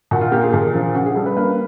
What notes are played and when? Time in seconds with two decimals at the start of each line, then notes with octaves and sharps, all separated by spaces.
0.11 A#2 F#4
0.21 F4
0.32 A#3 G4
0.43 G#4
0.54 A#2
0.74 F3
0.95 C#3 F#4
1.06 G#4
1.15 G3 A4
1.26 B4
1.37 A#3 B4